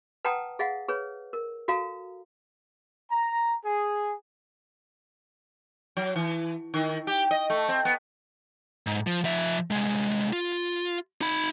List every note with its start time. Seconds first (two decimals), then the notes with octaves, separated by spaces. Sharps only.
0.25 B4 F#5 G5 A5 A#5 D#6
0.59 G#4 D#5 F5 F#5
0.88 G#4 B4 C#5
1.33 A#4
1.68 F#4 A4 F5 A#5
3.11 A#5
3.65 G#4
5.97 F#3
6.16 E3
6.74 D#3
7.07 G4
7.31 D#5
7.50 A3
7.69 C4
7.85 B3
8.87 G#2
9.07 F3
9.24 F3 E5
9.70 C2 G#3
10.33 F4
11.21 D#4 B5